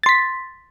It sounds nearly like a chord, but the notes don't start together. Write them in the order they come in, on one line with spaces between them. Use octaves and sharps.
A6 C6 B6